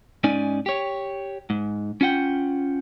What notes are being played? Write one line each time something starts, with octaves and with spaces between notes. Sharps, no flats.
G#2 C#4 D#4 D5 G#5
G4 C#5
G#2
C#4 F4 F#5 G5